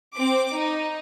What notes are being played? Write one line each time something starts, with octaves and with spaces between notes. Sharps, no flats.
C4 D6
D#4